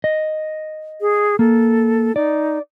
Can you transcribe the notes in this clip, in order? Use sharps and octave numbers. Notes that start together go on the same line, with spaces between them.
D#5
G#4
A#3 A4
D#4 D5